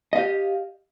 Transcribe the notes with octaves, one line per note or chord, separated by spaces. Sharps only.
G4 D#5 F5